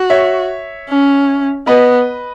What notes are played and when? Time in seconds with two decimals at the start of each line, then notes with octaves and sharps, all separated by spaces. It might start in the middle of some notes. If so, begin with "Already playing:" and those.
Already playing: F#4
0.10 C#5 E5
0.89 C#4
1.67 B3 B4 D#5